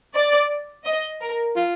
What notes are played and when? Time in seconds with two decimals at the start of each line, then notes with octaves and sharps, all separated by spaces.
0.15 D5
0.85 D#5
1.22 A#4
1.56 F4